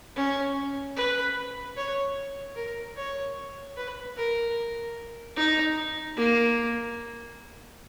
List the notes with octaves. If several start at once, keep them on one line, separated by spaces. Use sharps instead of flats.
C#4
B4
C#5
A#4
C#5
B4
A#4
D#4
A#3